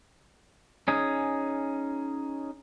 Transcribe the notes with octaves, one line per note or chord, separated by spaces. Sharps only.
C#4 D#4 G#4